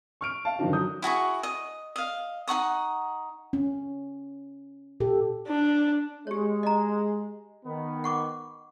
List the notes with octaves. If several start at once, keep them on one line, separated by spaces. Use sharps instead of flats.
C#6 F6 D7
F5 A5
F#2 D3 D#3 F3 D4 F#4
F#3 D#6 G6
E4 F#4 G#4 C#6
D#5
D#5 F5
D#4 F#5 C#6 D#6
C#4
A#2 G4 A4
D4
G#3 G4 C#5
D#5 A#5
D#3 B3
F#5 C#6 D6